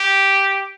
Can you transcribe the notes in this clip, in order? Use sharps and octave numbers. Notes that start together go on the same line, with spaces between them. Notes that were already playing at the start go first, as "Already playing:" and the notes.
Already playing: G4